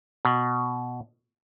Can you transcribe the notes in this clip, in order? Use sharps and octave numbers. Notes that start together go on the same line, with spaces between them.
B2